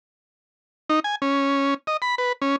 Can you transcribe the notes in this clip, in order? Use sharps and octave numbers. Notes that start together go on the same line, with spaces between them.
D#4
G#5
C#4
D#5
B5
B4
C#4